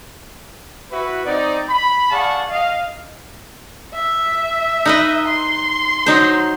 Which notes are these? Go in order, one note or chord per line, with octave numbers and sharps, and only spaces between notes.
E4 F#4 B4
C4 D#4 D5
B5
G#4 D5 F5 F#5 A5 C#6
D#5 F5
E5
D#4 B4 D#5
C6
F#3 D#4 C5